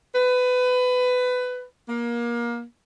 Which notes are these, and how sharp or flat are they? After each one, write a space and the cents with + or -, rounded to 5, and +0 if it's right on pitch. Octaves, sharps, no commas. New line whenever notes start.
B4 +20
A#3 +25